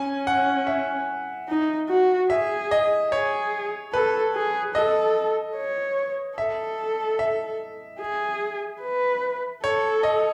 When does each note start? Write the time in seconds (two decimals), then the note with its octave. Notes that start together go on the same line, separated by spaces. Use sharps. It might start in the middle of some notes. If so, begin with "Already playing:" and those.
Already playing: C#4 G#5
0.27 F#5
0.67 E5
1.48 D#4
1.89 F#4
2.30 G#4 E5
2.71 D#5
3.11 G#4 C#5
3.93 A4 B4
4.34 G#4
4.74 A4 D#5
5.56 C#5
6.38 A4 E5
7.19 E5
8.00 G#4
8.81 B4
9.63 A4 C#5
10.03 D#5